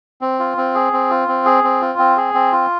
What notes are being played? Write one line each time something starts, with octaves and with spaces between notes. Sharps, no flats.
C4
F4
C4
G#4
C4
F4
C4
G#4
C4
F4
C4
G#4
C4
F4